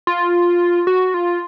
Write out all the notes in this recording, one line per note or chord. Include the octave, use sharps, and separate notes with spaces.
F4
F#4
F4